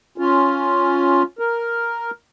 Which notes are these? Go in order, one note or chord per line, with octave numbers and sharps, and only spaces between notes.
C#4 F4
A#4